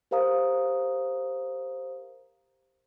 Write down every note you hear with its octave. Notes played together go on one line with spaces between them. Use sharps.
G4 A#4 C5 F5 A#5 D#6